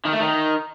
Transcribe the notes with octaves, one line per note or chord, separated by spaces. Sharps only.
D#3
A3
D#3